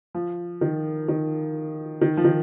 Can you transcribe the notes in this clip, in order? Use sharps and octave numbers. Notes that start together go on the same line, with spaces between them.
F3
D#3
D#3
D#3
F3
D#3